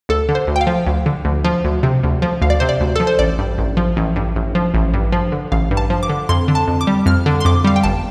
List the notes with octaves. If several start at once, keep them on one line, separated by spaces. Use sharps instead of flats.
D2 A4
D3
C5
D2
G5
F5
F3
D2
D3
D2
F3
D2
C3
D2
F3
D2 F5
D5
C3 C5
D5
D2
F3 A4
C5
A1 D5
G2
A1
F3
A1
G2
A1
F3
A1
G2
F3
D3
A1 F5
G2
A5
F3
D6
D3
F2 C6
D3
A5
F2
D6
G3
F2 F6
D3
C6
F2 D6
G3 F5
G5
G1 A5